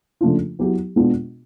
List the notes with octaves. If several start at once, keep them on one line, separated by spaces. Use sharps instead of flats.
C#3 F3 A3 D4 F4
F#3 B3 E4 G4
B2 G#3 B3 D4 F4